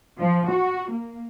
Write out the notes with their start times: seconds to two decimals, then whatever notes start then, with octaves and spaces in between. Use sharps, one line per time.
0.19 F3
0.49 F#4
0.90 A#3